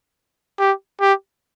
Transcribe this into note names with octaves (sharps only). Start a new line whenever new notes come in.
G4
G4